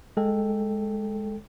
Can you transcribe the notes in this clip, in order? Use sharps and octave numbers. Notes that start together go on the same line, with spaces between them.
G#3 A4 G5